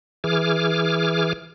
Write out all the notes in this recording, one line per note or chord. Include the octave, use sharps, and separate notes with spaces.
E3 G#4 D6 F6